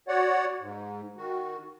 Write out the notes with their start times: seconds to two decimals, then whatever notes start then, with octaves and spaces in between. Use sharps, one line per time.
0.08 F#4 C#5 D5 F#5
0.60 G#2
1.17 D#3 F#4